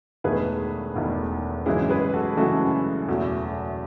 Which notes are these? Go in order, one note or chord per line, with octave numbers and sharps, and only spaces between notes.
E1 E2 D#3 A3 G#4 B4
E1 E2 D#3 A3
G#1 F#2 C#3 E3 G#3 E4 G#4
G#4 B4
F#4 A4
G#1 F#2 C#3 E3 G#3 F#4 A4
F#1 E2 B2 F#3 A3